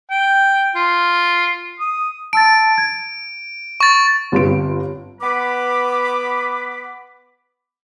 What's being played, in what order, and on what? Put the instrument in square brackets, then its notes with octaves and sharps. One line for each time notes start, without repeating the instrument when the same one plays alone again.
[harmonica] G5
F4
D#6
[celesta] A5 E6 A6 [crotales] D7
[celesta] G#6
[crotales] C#6 A6
[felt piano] G1 G2 C4 F4 B4 D7
[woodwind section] B3 B4 B5 D6